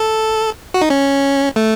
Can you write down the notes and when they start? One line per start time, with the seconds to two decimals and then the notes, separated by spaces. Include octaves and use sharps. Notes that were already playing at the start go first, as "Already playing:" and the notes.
Already playing: A4
0.74 F#4
0.82 D#4
0.90 C#4
1.56 A3